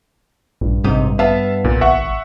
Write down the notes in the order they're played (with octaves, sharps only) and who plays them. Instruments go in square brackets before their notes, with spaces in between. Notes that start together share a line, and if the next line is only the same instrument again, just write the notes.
[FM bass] A#1 [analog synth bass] G2
[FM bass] A1 [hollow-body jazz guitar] G#2 C3 D#4
[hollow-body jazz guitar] B3 [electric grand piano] E5 F5 A5
[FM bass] B1 [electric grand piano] A#2
[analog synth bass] G#1 [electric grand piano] E5 F#5 C#6